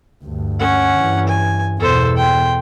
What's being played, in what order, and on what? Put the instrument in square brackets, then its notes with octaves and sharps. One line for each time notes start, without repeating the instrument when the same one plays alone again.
[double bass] D2 G2
[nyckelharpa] C#4 F#5
[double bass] G2 E3
[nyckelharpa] G#5
[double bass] E2 B2 [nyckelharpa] A4 C5
[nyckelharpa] G5 C6